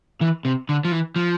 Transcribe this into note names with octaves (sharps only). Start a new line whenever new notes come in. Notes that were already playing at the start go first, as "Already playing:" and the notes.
E3
C3
D3
F3
E3
F3